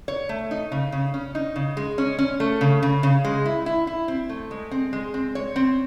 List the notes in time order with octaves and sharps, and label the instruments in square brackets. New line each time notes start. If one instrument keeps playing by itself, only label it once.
[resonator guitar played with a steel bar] C#5
A3
D#4
C#3
C#3
C#4
D#4
C#3
G#3
C#4
C#4
A3
C#3
C#3
C#3
G#3
E4
E4
E4
C4
A3
G#3
C4
G#3
C4
C#5
C4